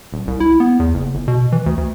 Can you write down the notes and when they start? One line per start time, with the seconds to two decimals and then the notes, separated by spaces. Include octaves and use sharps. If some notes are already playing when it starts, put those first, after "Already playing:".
0.12 D#1
0.27 C2
0.40 E4
0.60 B3
0.79 E2
0.94 F#1
1.14 G1
1.28 B2
1.52 E3
1.66 D2
1.77 D2